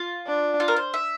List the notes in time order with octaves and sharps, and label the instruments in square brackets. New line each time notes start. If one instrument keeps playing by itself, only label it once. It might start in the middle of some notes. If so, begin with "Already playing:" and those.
Already playing: [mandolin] F4
[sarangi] D4
[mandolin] F4
A#4
C5
E5